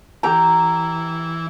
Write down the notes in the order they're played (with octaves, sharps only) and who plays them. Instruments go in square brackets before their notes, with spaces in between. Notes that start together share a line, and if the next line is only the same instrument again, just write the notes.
[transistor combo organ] E3 [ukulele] G4 A#5